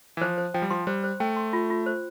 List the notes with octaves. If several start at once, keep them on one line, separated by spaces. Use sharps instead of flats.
E3
F3 C5
C5
F3 G5
G3
F3 C6
G3 C5
C5
A3 G5
C6
F4
F4
C5